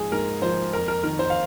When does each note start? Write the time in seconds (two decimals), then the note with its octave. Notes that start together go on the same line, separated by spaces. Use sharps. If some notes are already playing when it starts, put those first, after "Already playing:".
Already playing: G#2 F3 G#4
0.12 G#2 A#4
0.42 F3 C5
0.73 F2 A#4
0.88 A#4
1.03 D#3 A#4
1.19 C5
1.30 F5